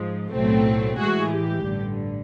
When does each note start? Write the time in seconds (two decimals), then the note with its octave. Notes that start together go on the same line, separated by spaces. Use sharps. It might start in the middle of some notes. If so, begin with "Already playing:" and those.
Already playing: G#2 F3 G#3
0.31 B1 A2 F#3 A3 C4
0.99 A2 E3 G#3 F#4 G#4
1.32 G4
1.66 A1 G2 D3